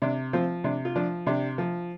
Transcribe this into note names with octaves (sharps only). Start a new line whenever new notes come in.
C3 D4
F3 C4 F4
C3 D4
F4
F3 D4
C3 D4 G4
F3